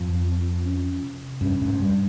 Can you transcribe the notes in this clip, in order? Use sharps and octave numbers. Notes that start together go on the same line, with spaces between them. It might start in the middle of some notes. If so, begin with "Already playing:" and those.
Already playing: F2 G#2
C4
C#4
C3
G2 C#4
G#2
G2 G3